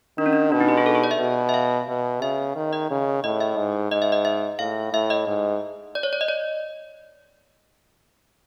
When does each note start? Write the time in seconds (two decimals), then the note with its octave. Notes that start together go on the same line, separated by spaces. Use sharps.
0.18 D#3 D4
0.26 C#4
0.33 D4
0.52 B2 D4
0.60 D#4
0.68 G4
0.77 G#4
0.86 A4
0.95 G#4
1.04 D5
1.11 E5
1.20 B2
1.49 E5
1.54 F5
1.88 B2
2.21 C#3 E5
2.56 D#3
2.73 D#5
2.90 C#3
3.24 A2 D#5
3.41 E5
3.57 G#2
3.91 G#2 D#5
4.02 E5
4.12 D#5
4.25 E5
4.59 A2 F5
4.93 A2 E5
5.10 D#5
5.27 G#2
5.95 D5
6.03 C#5
6.13 D5
6.21 D#5
6.28 D5